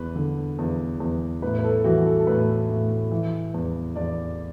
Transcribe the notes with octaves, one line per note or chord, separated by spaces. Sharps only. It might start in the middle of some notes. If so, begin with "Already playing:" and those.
Already playing: E2 B4
D3
E2
E2
A2 B4
B4
A4
E3 F#4
A4
A4
A2 B4
A2
E3
E2
E2 D5